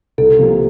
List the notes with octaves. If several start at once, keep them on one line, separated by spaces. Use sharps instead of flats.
C2 A4
C3 F3 A#3